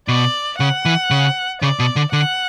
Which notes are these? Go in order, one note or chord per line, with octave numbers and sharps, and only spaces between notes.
B2 D5
C#3 F#5
E3
C#3
C#3 D5
B2
D3
D3 F#5